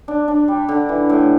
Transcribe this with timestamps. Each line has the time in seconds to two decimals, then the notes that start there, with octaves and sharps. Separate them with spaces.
0.08 D4
0.28 D4
0.48 G3
0.69 D3
0.89 E3
1.09 A2